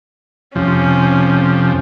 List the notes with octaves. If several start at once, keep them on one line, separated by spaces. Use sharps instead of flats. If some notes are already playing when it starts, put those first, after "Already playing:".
F2 C3 F3 C#4